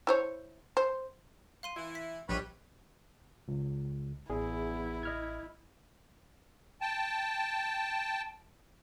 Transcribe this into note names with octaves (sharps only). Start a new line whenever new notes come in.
E4 C5 C#5
C5
F5 C6 D#7
E3 E4
B6
A#1 G3 B4 C#5 C#6
C#2
A1 E2 E4 G#4
D#5 F6 G#6
G5 A5